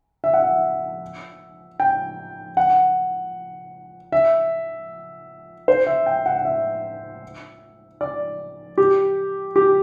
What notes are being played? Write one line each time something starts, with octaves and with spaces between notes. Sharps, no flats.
E5
F#5
E5
G5
F#5
E5
C5
E5
G5
F#5
F#5
E5
D5
G4
G4